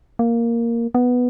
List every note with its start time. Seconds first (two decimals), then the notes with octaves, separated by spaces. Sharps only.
0.19 A#3
0.95 B3